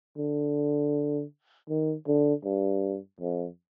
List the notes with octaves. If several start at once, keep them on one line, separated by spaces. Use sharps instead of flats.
D3
D#3
D3
G2
F2